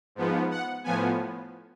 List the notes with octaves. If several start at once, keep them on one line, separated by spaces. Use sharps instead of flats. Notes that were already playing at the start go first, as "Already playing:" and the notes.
G#2 F3 B3
F#5
A2 F3 B3 G#5